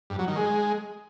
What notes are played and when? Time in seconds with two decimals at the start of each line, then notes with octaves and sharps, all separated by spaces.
0.10 G2
0.19 F#3
0.28 D#3
0.36 G#3